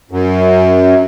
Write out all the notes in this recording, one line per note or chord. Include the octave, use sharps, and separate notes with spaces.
F#2